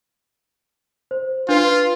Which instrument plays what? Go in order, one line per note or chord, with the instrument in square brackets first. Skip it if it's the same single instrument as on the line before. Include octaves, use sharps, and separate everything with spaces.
[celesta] C5
[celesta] D4 B4 C7 [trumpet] F4